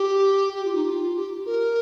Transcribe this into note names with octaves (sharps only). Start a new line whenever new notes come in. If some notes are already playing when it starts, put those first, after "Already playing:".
Already playing: G4
G4
F4
D#4
F4
G4
A#4